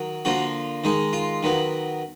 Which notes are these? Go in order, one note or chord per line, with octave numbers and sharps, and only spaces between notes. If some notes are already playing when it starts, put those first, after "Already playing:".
Already playing: D#3 F#3
D3 F3 A#3 F#4
D#3 G#3 D#4
F4
D#3 F#3 B3